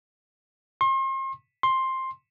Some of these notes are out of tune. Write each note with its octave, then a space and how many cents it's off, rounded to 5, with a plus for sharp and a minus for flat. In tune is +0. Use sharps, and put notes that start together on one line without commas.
C6 +40
C6 +10